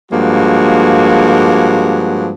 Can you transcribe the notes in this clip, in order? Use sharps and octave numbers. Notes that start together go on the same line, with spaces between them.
G2 F3 G#3 A#3 F#4